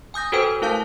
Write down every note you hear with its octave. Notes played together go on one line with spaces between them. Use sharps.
G#5 D#6 G6 A#6
F#4 A4 B4 C5 G5 G#5
A3 E4 A#4 F5 A5 G6